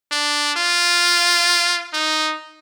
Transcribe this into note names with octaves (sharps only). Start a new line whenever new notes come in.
D4
F4
D#4